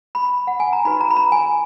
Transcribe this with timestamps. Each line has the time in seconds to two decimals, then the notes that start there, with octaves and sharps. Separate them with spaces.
0.15 B5
0.47 F#5
0.60 G#5
0.73 A#5
0.85 D#4 F#4 B4 B5
1.01 A#5
1.10 B5
1.17 A#5
1.32 G#5